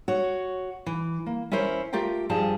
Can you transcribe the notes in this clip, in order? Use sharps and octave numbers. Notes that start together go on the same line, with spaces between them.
F#4 C#5
E3
A#3
C#4 E4 A#4 C5 C#5
A3 F4 G4 A#4 G5
G2 F3 G3 G#4 A5